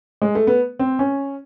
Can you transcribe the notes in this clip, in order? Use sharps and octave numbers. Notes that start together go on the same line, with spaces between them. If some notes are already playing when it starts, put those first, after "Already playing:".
G#3
A3
B3
C4
C#4